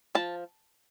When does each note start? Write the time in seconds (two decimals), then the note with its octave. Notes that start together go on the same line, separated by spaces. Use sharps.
0.15 F3 A5